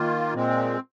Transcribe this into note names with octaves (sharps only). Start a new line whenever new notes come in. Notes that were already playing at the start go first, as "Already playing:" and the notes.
Already playing: D#3 A#3 F4
A#2 G#3 C4